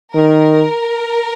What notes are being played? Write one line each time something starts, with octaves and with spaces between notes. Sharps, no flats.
D#3 A#4